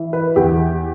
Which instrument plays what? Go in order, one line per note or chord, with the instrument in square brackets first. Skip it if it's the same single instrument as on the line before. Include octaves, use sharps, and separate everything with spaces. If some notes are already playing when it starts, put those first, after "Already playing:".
Already playing: [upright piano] E3
B4
E2 G4